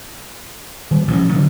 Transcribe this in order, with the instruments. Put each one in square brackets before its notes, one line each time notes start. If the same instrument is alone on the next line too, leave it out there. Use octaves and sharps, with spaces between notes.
[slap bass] D#3 G3
A1 F3 C#4
D3 D#3 F#3